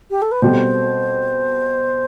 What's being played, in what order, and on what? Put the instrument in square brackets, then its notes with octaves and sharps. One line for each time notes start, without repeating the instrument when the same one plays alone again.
[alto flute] G4
A4
B4
[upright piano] B2 G3 C4 F#4 A4 [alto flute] C5